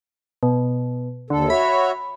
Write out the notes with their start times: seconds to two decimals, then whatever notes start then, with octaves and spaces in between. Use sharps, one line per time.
0.43 B2
1.30 D#2 D3 A4
1.50 F#4 C#5 E5 B5